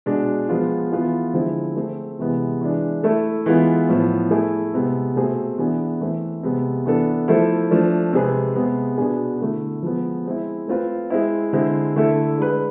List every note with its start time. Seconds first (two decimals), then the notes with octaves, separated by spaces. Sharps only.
0.06 B2 G#3 D4
0.49 F3 G#3 B3 F4
0.91 E3 B3 F4 G#4
1.33 D3 F3 G#3 C4 E4
1.76 A3 C4 G#4 C5
2.19 C3 E3 G#3 B3
2.61 E3 G#3 D4
3.03 A3 E4 A4
3.46 E3 G#3 B3 F4
3.89 A2 F3 B3
4.31 A3 E4 G#4
4.74 C3 G#3 B3
5.16 B2 A3 C4 G#4 C5
5.58 E3 B3 D4 G#4
6.01 E3 A3 C4
6.43 C3 G#3 B3
6.86 E3 B3 D4 A4
7.28 F3 A3 E4 A4 C5
7.71 F3 A3 D4
8.13 C3 G#3 C4 G#4 B4
8.56 C3 G#3 B3
8.98 B2 B3 D4 G#4
9.40 D3 A3 E4
9.83 F3 G#3 B3
10.26 G#3 C4 E4
10.68 A3 C4 F4 B4
11.10 G#3 C4 E4
11.53 D3 G#3 C4 E4
11.96 D3 A3 E4 A4
12.37 G#3 D4 G#4 B4